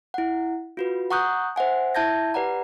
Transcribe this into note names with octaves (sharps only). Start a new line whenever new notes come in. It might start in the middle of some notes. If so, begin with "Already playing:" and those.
E4 F#5
F4 F#4 B4
F#5 A#5 C#6 D#6 F#6 G6
C5 E5 F#5 G#5
E4 E5 A5 G6 G#6 A#6
G4 B4 D5 F#5 A#5